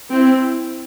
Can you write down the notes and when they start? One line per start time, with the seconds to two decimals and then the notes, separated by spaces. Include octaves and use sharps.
0.12 C4 E4